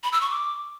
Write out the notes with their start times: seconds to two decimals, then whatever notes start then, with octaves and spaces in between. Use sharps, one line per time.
0.03 B5
0.12 E6
0.21 C#6
0.30 D6